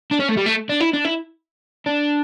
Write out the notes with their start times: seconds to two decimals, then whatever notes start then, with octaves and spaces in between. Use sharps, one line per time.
0.11 D4
0.20 C#4
0.29 A3
0.37 G3
0.46 A3
0.70 D4
0.80 E4
0.93 D4
1.04 E4
1.86 D4